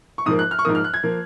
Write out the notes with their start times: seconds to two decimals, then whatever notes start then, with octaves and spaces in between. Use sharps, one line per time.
0.18 C#6
0.26 G#2 F3 A#3 D#6
0.39 F#6
0.51 F6
0.59 C#6
0.64 G#2 F3 A#3 D#6
0.75 F6
0.84 F#6
0.94 G#6
1.03 F3 A#3